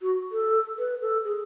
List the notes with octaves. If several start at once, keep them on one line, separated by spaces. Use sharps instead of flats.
F#4
A4
B4
A4
G#4